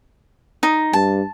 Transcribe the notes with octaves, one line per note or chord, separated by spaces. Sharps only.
D#4
G2 A5